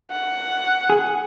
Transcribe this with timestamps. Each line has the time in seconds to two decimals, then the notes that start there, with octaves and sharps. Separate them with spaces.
0.11 F#5
0.90 G#4